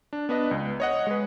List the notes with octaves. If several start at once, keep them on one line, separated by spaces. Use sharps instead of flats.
D4
B3 D4 B4 D#5
C#2
C#5 D#5 F#5
G#3 G#4 B4